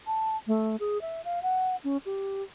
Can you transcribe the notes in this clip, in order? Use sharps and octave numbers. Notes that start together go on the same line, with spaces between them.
A5
A3
G#4
E5
F5
F#5
C#4
G4